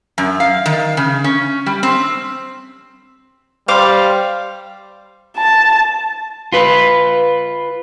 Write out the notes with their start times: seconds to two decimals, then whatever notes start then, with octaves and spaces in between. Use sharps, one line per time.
0.18 F#2
0.40 F5
0.66 D#3
0.97 C#3
1.24 C#4
1.66 G3
1.83 C4
3.68 G3 C5 F5 D6
5.37 A5
6.52 F4 B4